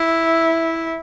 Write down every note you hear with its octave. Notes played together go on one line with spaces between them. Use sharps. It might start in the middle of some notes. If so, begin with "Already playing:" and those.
Already playing: E4